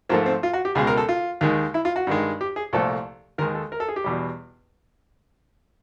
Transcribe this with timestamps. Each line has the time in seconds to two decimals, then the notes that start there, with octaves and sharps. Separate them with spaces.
0.09 G#2 F3 A3 A#3
0.26 C4
0.43 F4
0.53 F#4
0.65 G4
0.75 C#2 B2 G#3 G#4
0.87 A#4
0.97 A4
1.09 F4
1.41 D#2 D#3 G#3
1.74 E4
1.85 F4
1.96 F#4
2.07 G2 D#3 G#3
2.41 G4
2.56 G#4
2.73 C2 A#2 F3 A3 A4
3.38 D#2 D#3 G#3 A#4
3.55 A4
3.72 A#4
3.80 A4
3.88 G#4
3.96 G4
4.04 E2 B2 G3